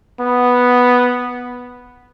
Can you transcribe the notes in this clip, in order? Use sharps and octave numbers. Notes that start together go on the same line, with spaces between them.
B3